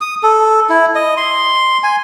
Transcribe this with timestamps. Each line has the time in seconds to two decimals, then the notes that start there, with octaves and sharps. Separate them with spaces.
0.01 D#6
0.23 A4
0.69 E4
0.95 D#5
1.17 C6
1.83 G#5